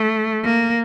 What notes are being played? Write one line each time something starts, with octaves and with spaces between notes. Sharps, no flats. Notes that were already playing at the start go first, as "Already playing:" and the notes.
Already playing: A3
A#3